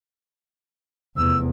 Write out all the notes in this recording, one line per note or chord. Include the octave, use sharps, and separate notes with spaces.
F1 E2 E6